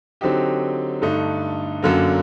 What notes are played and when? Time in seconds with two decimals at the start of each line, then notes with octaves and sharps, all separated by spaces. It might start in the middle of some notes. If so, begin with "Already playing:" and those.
0.21 D3 F#3 C4 D#4 G4
1.02 G2 D3 A3 D#4
1.82 F#2 D3 F#3 A#3